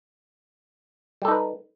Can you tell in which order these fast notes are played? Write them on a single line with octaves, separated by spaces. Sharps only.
G3 A4 D#4 B4